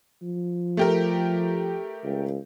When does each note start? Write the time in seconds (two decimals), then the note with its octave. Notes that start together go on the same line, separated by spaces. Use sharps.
0.22 F3
0.77 A3 G4 A#4
2.04 C#2